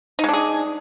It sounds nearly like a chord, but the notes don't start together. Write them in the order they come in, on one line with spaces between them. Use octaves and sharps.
D#4 G#3 D4 G#4